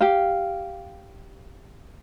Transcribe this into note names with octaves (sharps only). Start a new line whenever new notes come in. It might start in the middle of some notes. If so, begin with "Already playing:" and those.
G4 F5